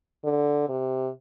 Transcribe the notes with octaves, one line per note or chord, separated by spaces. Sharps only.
D3
C3